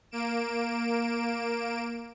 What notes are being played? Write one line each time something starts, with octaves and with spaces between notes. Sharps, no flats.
A#3 D7 E7